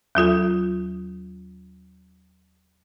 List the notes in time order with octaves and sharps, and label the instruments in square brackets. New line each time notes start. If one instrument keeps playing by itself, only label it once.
[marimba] D#2 F#3 F4 A4